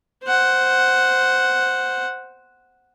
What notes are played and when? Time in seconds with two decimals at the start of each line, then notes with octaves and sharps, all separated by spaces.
0.24 C5 F#5